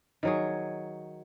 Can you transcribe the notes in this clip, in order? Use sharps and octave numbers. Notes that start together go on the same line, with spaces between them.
D#3 F#3 G#4